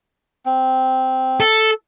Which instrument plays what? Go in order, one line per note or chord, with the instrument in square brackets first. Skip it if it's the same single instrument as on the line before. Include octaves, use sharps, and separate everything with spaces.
[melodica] C4
[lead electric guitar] A4